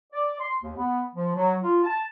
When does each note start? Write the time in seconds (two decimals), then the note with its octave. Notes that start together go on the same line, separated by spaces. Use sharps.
0.13 D5
0.39 C6
0.63 D#2
0.77 B3
1.14 F3
1.35 F#3
1.62 F4
1.84 A5